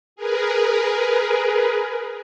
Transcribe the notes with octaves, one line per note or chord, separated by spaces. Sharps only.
G#4 A#4 B4